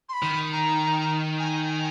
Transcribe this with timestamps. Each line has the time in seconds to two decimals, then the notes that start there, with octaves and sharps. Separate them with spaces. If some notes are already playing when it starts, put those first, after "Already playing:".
0.09 C6
0.13 B5
0.22 D#3
0.52 A#5
1.39 G#5